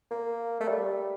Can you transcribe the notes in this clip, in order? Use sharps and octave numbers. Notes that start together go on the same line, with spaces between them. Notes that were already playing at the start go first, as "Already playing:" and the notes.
A#3
A3
G3